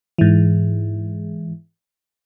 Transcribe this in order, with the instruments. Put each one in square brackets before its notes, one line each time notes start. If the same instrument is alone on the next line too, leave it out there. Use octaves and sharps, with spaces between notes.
[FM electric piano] G#2 E3